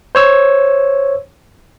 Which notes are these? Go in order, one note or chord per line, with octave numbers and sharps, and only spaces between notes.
C5 C#5 E6